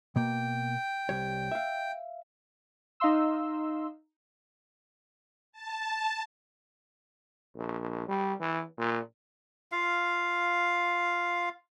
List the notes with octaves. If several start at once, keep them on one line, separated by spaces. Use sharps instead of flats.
B2 A#3 G5
C2 G3 C#5
E5 F5
D#4 D#5 F5 C6 E6
A5
A#1
G3
E3
A#2
F4 F5